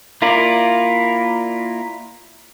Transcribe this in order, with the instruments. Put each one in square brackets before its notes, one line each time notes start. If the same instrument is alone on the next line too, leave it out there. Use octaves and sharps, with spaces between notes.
[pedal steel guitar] A#3 E4 F4 A#4 D5